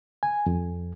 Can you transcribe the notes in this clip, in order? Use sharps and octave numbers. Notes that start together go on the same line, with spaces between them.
G#5
F2